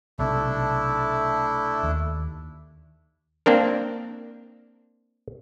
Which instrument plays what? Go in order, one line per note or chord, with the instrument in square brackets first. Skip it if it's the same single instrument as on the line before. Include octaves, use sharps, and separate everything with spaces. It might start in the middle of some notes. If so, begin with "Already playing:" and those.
[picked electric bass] B1 C3 [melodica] A3 D4 E4
[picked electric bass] D#2
[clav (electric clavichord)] A#3 C4 D4 A#4